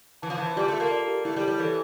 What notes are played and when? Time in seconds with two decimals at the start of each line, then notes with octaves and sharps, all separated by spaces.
0.22 E3 A5
0.30 F3
0.38 E3 A5
0.56 G3 F4
0.68 A3
0.74 F4
0.80 A#3
0.91 D5
1.08 G4
1.25 A3 E4
1.36 G3
1.42 C#5
1.48 G3
1.59 E3 A4